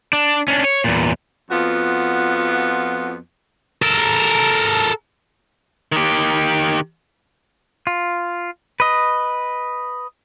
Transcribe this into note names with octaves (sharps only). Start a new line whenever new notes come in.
D4
C#4 D4
C#5
E2 A#2
F2 B3 F4 F#4
A4 A#4
D#3 G4
F4
B4 D#5